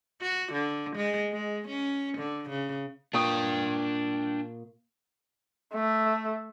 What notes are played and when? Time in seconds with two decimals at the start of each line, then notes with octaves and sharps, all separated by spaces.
0.22 F#4
0.53 D3
0.96 G#3
1.33 G#3
1.69 C#4
2.18 D3
2.50 C#3
3.13 A#2 D4 G5 C#6 D#6
5.74 A3